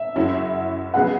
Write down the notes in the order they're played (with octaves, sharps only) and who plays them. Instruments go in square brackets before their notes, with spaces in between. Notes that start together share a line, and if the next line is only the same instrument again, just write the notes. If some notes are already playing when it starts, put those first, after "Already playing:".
Already playing: [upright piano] E5
[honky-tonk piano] F#2 C#3 F#3 C#4 E4
[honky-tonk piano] C#3 F#3 B3 G#4 B4 [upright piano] F#5